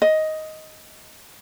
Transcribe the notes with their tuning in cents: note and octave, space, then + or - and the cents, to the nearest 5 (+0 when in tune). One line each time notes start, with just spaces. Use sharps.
D#5 +10